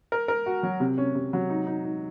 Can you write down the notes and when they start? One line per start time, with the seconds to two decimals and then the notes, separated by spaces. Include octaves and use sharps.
0.12 A#4
0.28 A#4
0.46 F#4
0.63 F#3
0.80 C3
0.98 C#4
1.15 C3
1.33 F#3
1.50 D#4
1.67 D#4
1.85 D#4